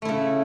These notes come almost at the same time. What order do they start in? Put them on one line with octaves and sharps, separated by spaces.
A3 E4 C#3